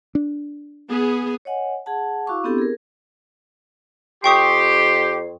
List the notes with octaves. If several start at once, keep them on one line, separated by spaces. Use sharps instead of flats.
D4
B3 G#4
C#5 D#5 F#5 G#5
G#4 F#5 A5
E4 F#4 F5 C#6 D6
B3 C4 D4 E4 G4 A4
G#4 A#4
F2 G4 G5 C6 C#6 D#6